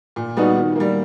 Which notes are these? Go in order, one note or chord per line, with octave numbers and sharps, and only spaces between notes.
A#2
G3 B3 D#4 F#4
D#3
G3 A#3